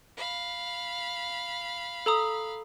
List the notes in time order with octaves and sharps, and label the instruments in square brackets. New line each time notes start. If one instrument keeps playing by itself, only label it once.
[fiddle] F5 B5
[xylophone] A4 A#5 D#6